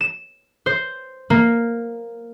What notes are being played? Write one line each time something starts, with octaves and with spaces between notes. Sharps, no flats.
E7
C5
A#3